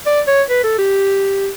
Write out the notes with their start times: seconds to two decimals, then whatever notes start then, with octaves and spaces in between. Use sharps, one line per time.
0.06 D5
0.27 C#5
0.50 B4
0.64 A4
0.79 G4